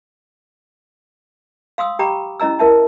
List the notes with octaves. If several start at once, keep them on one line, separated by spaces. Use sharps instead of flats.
F5 C6 D#6 E6
G4 G5 A#5 B5 D6
C#4 E4 D#5 A#5 E6
E4 A#4 E5 A5